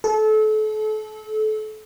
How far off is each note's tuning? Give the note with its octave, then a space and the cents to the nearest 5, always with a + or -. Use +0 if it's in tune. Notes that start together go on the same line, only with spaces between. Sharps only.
A4 -30